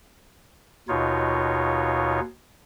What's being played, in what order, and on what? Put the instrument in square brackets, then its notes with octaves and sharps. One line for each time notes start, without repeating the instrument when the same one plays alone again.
[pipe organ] D#2 B2 D#4 F4 C#5